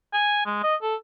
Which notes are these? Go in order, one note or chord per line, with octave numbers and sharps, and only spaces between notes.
G#5
G#3
D#5
A4